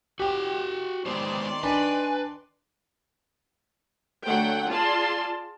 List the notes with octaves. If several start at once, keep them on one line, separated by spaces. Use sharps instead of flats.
F#4 G4 G5
D#3 G#3 B3 C5 D5 C6
D4 B4 G#5
D3 F#3 A3 F#5 G5
F4 G#4 D5 A5 C6